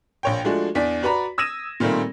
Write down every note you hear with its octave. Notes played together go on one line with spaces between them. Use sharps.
A#1 C#5 G5
F3 G#3 A3 D4 F#4
E2 D4 D5 B6
F#4 B4 D5 A#5 B5
D#6 E6 G#6 A#6 D#7 E7
A#2 D#3 G3 A3 A#3 C4